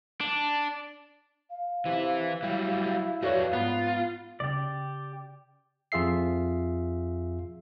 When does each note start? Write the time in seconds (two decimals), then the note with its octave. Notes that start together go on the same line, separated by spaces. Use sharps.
0.21 D4
1.50 F5
1.85 C3 E3 E4
2.43 F#3 G3 E4
3.22 F2 F#4 A4 B4 C#5 D5
3.53 G#2 B3 F4
4.40 C#3 C#4 G4 D5
5.92 F2 F4 G#4 E5 C7